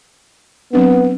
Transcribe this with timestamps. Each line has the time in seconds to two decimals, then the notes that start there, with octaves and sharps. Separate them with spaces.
0.73 F#3 B3 C4 D4